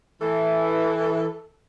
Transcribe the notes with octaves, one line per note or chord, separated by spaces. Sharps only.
E3 A4